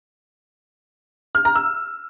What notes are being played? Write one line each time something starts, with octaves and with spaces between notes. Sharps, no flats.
F6
A#5
E6